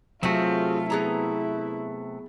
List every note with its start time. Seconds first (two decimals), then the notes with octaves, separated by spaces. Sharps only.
0.23 C3 F#3 A3 C4 F4 F#4 G#4
0.90 B3 E4 G#4 A#5